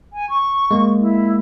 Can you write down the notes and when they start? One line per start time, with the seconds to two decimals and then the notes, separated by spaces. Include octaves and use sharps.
0.13 G#5
0.30 C#6
0.71 G#3 A#3
1.00 E4